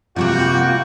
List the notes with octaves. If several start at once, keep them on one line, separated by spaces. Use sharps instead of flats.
C3 G3 A#3 F4 F#4 G5